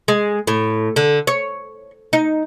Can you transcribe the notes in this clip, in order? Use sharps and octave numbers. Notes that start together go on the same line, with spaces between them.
G#3
A2
D3
C#5
D#4